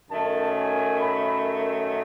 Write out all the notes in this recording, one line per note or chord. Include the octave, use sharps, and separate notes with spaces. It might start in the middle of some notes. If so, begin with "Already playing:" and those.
F#2 D#3 A3 C#4 A5
G#5
B5